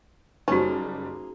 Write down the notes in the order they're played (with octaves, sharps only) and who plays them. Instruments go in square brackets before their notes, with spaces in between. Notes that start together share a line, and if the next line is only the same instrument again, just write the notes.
[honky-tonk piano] F#1 G3 [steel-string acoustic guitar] A#3 G#4 C5 [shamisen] C#4 [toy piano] D#4 F#4